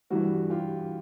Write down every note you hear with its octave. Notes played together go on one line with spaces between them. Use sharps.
G2 E3 G3 F#4
F4 G4